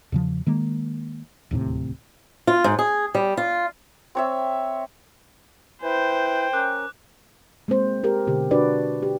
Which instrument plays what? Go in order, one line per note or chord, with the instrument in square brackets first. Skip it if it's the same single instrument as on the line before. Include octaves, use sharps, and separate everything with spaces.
[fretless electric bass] E2 C#3 F3
D#3 G#3 A#3
D1 D#2 A2 C3
[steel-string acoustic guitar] F4
G#2
G#4
G3
F4
[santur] C4 C#5 E5
[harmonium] E4 B4 [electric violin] C5 [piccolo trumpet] G5
[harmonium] C#4 A#4 [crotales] D6 F#6
[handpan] G#3 A#3 C4 C5
G4 A#4
B2 D3 G4
D4 F#4 B4 D5
G4